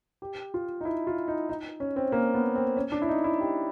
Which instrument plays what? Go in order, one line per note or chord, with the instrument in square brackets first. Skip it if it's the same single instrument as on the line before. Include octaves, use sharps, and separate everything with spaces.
[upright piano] G4
F4
D#4
E4
F4
D#4
D#4
C#4
C4
A#3
B3
C4
C#4
D4
E4
D#4
E4
G4